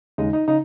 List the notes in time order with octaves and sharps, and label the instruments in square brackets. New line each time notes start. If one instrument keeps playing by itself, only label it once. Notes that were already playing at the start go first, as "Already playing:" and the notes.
[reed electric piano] D#2 C#3 G#3 D#4
D#4
C#3 D#4